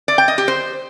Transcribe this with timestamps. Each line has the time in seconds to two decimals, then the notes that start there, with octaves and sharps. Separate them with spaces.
0.08 D5
0.18 G5
0.28 D#5
0.38 G4
0.48 C5